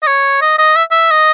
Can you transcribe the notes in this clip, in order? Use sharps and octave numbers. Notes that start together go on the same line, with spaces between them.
D#5
C#5
D#5
D#5
E5
E5
D#5